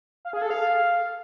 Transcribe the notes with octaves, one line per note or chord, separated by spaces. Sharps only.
F5
G#4
A4
F5